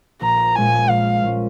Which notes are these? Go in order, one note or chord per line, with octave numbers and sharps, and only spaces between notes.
A#1 A#5
A#2 G#3 C#4 F4 G#5
A#1 F5
A#2 G#3 C#4 F4